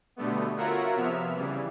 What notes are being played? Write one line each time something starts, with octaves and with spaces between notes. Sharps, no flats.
B2 D3 G3 A3 B3
F4 F#4 A#4 C#5 E5 F#5
C3 F3 B3 E5 F6
C#3 E3 G3